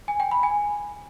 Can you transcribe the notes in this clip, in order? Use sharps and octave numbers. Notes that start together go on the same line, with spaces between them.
G#5
G5
B5
G#5